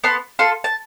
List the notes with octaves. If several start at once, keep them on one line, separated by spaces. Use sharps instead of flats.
B3 A5 C6
F4 A4 A5 C6
A5